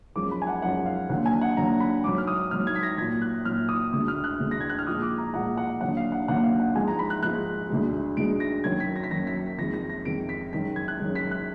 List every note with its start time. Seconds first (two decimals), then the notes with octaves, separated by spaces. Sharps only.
0.16 F#2 F3 G#3 D6
0.31 B5
0.42 G#5
0.47 F#5
0.62 F#2 F3 G#3 F#5
0.86 F5
1.09 D#2 D3 F#3 F#5
1.26 G#5
1.41 F#5
1.57 D#2 D3 F#3 A#5
1.80 B5
2.04 G#2 F#3 D6
2.18 F6
2.27 D#6
2.51 G#2 F#3 F6
2.67 G#6
2.75 B6
2.83 A#6
2.98 A#2 F#3 G#6
3.22 F#6
3.45 A#2 F#3 F6
3.69 D#6
3.93 D2 D3 G#3 D#6
4.08 F6
4.24 F#6
4.40 D2 D3 G#3
4.51 A#6
4.61 G#6
4.70 F#6
4.79 F6
4.87 A#2 F3 G#3 D#6
5.02 D6
5.18 A#5
5.34 A#2 F3 G#3 F#5
5.57 F#5
5.81 D#2 D3 F#3 F#5
5.97 F5
6.12 F#5
6.28 D#2 D3 F#3 F#5
6.44 F5
6.60 F#5
6.75 G#2 F3 G#3 G#5
6.88 A#5
6.99 B5
7.10 F#6
7.23 G#2 F3 G#3 F#6
7.70 D2 D3 G#3
8.17 D2 D3 G#3 D7
8.40 A#6
8.64 F#2 D#3 F#3 G#6
8.80 B6
8.96 A#6
9.04 B6
9.11 F#2 D#3 F#3 A#6
9.27 B6
9.58 F2 D#3 G#3 A#6
9.74 A#6
9.90 A#6
10.05 F2 D#3 G#3 D7
10.29 B6
10.53 F#2 D#3 G#3 B6
10.76 G#6
10.88 F#6
10.99 F#2 D#3 G#3
11.15 B6
11.31 F#6